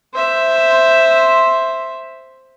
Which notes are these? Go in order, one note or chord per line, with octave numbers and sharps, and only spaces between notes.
C5 E5